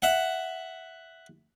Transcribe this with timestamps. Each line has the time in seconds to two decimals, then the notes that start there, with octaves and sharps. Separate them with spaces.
0.02 E5 F#5